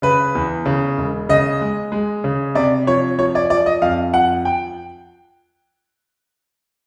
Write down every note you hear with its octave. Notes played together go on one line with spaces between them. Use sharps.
C#3 B4
E2
C#3
E1
C#3 D#5
G#3
G#3
C#3
C3 D5
F3 C#5
F3 C#5
D5
F3 D5
D#5
F2 F5
F3 F#5
G5